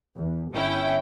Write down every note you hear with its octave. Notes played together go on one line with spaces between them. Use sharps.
E2
G1 C#4 E4 G5